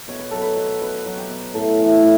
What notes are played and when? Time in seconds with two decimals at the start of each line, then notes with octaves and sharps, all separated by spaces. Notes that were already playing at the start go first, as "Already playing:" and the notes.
0.08 B2 C#5
0.19 B4
0.31 F#3 A4
0.42 B4
0.56 B2
0.81 B2 B4
1.06 F#3
1.17 G4
1.29 B2
1.54 A2 A4
1.79 E3
2.02 A2